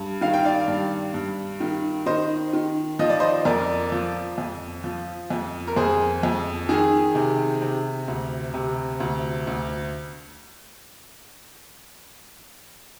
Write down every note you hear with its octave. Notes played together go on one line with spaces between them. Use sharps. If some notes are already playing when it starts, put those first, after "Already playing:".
Already playing: G2
D#3 F5
G5
D5 F5
G2
G2
D#3
D#3 C5 D#5
D#3
F3 D#5
D5
C5 D#5
F2 A#4 D5
F3
F2
F3
F2
A#4
F2 G#4 C5
F2
D#3 G#4
C3
C3
D2
C3
D2
D2